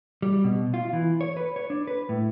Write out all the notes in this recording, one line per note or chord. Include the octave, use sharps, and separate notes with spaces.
G3
B2
F4
E3
C#5
B4
C#5
D4
B4
A2